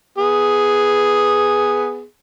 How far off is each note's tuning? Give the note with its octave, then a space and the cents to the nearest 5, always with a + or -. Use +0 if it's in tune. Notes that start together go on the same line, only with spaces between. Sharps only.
B3 +0 G#4 +0